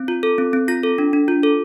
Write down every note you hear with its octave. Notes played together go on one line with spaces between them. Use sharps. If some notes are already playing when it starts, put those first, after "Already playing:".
Already playing: C4
F4
A4
C4
C4
F4 A#6
A4
D4
D4
F4
A4